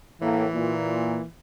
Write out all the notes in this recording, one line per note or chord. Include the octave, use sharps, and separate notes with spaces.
A2 E3 A#3
A#2